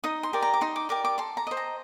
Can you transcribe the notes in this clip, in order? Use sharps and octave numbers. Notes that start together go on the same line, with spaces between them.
D#4 D#6
C6
G4 A#4 D5
A#5
D6
D#4 C6
D6
G4 A#4 D5 D6
D6
A4 C6
A#5
C5 D#5
A#5